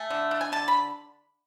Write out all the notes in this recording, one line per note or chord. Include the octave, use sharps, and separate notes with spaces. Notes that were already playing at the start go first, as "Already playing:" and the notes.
Already playing: A3 G#5
D3
D4
G#5
D3 A5
B5